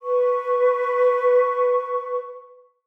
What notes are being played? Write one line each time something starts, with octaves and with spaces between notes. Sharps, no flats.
B4 C#6